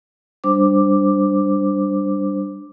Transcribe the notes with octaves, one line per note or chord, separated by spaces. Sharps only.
G3 D4 C5 D6